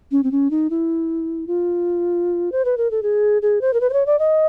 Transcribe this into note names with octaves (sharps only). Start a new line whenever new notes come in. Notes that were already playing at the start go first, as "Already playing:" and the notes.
C#4
C4
C#4
D#4
E4
F4
C5
B4
A#4
A4
G#4
G#4
C5
A#4
B4
C5
C#5
D5
D#5